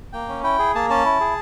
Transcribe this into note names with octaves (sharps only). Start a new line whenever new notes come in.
A#3 G5
C#4
E4 G5
G#4
A#3 A5
C#4 A5
E4
G#4